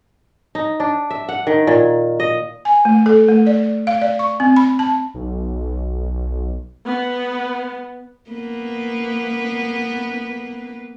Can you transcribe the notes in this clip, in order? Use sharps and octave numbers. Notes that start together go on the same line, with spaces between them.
D#4
D4
E5
F#5
D#3
A#2
D#5
G#5
A3
A4
A3
D5
F5
D5
C#6
C4
B5
A5
B1
B3
A#3 B3 B4